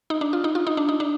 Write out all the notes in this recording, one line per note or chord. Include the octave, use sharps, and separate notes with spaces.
D#4
D4
F4
D#4
F4
D#4
D4
D#4
D4